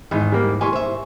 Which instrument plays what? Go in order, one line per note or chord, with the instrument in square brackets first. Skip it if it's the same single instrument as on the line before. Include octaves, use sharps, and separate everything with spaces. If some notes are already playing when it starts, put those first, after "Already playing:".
[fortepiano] G#1 [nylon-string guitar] E2 G#2
[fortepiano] G3 A#3
[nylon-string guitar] B2 E3 G3 [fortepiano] G#5 C6 C#6
[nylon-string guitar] C5 E5